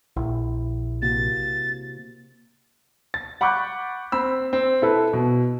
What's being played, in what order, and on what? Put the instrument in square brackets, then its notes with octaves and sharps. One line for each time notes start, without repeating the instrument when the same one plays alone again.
[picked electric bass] A#1 [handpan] E4
[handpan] C3 A#3 F#4 [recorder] A6
[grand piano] A6
F#5 B5 C#6 D6 F#6 G6
C4 B5 E6
C4
E4 A4 B4
B2